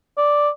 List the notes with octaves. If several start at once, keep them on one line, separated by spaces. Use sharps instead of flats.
D5